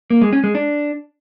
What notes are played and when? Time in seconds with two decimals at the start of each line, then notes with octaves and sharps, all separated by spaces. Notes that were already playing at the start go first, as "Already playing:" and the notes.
0.10 A#3
0.22 G#3
0.33 C#4
0.44 G#3
0.55 D4